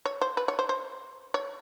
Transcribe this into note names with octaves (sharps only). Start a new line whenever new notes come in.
C#5
C5
B4
C#5
C5
C5
C#5